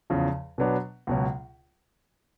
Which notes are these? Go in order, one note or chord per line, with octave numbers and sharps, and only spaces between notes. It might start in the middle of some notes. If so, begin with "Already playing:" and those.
E2 C#3 F3
B2 F#3 B3 D4
C#2 B2 F#3